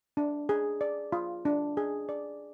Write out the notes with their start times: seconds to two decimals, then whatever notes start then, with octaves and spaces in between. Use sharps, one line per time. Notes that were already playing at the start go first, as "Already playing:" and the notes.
0.17 D4
0.49 G#4
0.81 D5
1.12 F4
1.45 D4
1.77 G#4
2.09 D5